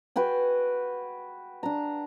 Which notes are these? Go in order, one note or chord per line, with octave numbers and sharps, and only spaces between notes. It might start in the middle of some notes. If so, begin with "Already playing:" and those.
F#4 B4 G5 G#5
D4 A#5